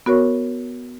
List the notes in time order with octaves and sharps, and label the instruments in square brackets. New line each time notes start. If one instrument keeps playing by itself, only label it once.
[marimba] B3 F#4 A#4 C#5 C#6